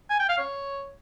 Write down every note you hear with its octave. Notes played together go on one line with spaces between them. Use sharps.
G#5
G5
F5
C#5